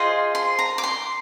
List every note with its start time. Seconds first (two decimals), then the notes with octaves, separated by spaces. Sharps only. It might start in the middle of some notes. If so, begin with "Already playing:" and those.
Already playing: F4 G#4 C5 D#5
0.35 C6
0.59 A#5
0.78 D6
0.83 C6